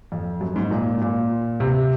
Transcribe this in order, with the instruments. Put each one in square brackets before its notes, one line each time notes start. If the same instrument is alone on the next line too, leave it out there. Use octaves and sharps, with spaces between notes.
[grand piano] F2
F#2
G#2
A#2
A#2
C3